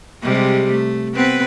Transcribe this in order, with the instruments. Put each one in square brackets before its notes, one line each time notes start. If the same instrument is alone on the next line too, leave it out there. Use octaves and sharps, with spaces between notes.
[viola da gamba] C3 G3 G#3
A3
B3 C4 B4